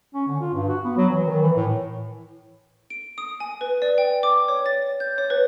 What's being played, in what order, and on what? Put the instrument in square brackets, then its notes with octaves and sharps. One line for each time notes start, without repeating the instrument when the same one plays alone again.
[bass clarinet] C#4
D3
F4
G2
F#4
B3
F#3
E3
D#3
E3
A2
[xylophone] D7
D#6
G#5
B4
D5
G5
D6
C#5
A6
G6
C#5
B4